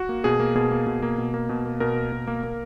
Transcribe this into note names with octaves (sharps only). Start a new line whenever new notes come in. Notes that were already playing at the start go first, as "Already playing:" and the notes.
Already playing: F#4
A#3
B2 G#4
A#3
B2 G#4
A#3
B2
A#3
B2
A#3
B2
A#3
B2 A#4
A#3
B2
A#3
A#3